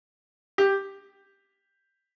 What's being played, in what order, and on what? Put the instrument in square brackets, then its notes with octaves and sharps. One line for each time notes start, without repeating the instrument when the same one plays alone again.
[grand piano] G4